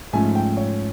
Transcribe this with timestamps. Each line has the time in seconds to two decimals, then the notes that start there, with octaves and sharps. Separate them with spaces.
0.13 G#2 F3 A3 C#4 G#5
0.35 G5
0.57 C#5